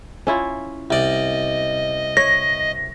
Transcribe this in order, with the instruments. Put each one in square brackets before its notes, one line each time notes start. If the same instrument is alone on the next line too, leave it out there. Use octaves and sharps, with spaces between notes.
[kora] C#4 E4 F4
[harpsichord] C2 D5 [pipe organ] D#5
[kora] C#5 [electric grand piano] A#6